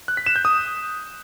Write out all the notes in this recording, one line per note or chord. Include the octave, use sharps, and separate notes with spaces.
F#6
B6
E7
G6
D#6